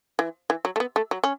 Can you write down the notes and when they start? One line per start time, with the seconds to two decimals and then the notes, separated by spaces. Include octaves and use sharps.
0.19 E3
0.50 E3
0.65 F#3
0.76 A3
0.80 B3
0.96 A3
1.11 F#3
1.24 C#4